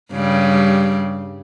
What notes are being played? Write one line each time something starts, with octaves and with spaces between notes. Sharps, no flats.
G2 C#3 G3